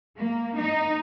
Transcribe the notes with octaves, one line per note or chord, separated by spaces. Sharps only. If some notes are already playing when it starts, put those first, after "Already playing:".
A#3
D#4